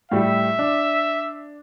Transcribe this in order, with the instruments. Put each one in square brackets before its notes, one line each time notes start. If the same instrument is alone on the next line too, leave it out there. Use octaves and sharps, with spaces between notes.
[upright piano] A2 G3 [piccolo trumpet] E5
[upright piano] D4